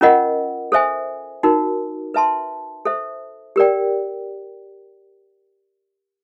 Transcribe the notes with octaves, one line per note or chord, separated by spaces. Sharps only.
C#4 F4 A#4 D#5 F#5
A4 C5 E5 G#5
D#4 F#4 A#4
B4 E5 A5 C6
A4 C5 E5
G4 A#4 D5 G5